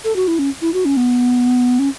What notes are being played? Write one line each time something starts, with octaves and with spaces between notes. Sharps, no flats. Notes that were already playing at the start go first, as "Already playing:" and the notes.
A4
F#4
E4
C#4
E4
F#4
C#4
B3
C#4